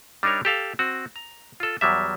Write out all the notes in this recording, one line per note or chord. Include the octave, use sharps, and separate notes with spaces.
G3 D4 D#4 A#4 C#5
G4 A4 F5
C4 F#4
A#5
F4 A4
E2 F#3 G3 E5